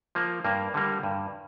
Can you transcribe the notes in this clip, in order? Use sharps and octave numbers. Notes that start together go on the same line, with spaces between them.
F3 A#3
G2 A#3
D3 G3 A#3
G2